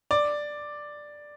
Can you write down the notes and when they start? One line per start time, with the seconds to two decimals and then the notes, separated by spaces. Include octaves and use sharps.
0.11 D5